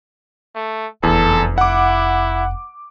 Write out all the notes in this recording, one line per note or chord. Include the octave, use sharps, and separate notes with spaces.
A3
F1 E2 D4 A4
E4 F#5 D6